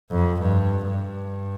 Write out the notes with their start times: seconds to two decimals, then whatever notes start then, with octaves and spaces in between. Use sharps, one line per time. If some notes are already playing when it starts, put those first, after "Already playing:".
0.11 F2
0.42 G2
0.90 G2